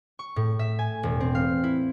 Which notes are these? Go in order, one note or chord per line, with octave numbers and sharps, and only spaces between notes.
C#6
A2
E5
G#5
E1
C4
F5
E4